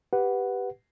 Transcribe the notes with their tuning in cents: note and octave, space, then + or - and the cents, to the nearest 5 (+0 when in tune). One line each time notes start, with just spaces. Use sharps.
G4 +0 B4 +0 F#5 +0